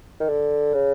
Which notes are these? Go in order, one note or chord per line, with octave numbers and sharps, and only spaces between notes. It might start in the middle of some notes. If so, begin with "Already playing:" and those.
D#3
D3
C#3